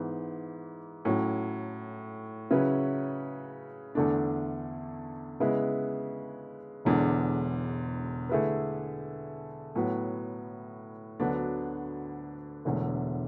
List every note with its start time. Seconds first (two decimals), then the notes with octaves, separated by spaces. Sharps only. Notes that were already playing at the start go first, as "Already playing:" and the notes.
Already playing: G#2 E3 B3
1.05 A2 F#3 C#4
2.50 C#3 F#3 C#4 E4 B4
3.95 E2 D3 A3 D4
5.40 C#3 G#3 B3 E4 B4
6.85 E1 E2 D3 G#3 D4
8.29 D3 A3 E4 G#4 B4
9.75 A2 F#3 B3
11.20 D2 D3 F#3 B3 D4
12.65 E1 E2 D3 A3